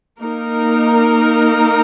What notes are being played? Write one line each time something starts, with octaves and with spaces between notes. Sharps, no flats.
A#3 D#4 A#4